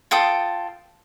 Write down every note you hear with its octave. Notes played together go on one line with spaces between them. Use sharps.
F4 A4 G5 D#6